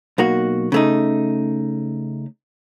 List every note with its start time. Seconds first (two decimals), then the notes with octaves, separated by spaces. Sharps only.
0.18 B1 A#3 F#4
0.72 C#3 A3 D#4